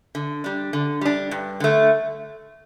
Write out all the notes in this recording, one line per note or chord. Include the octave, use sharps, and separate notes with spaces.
D3
G3 D4
D3
G3 D4
G2
D3 A3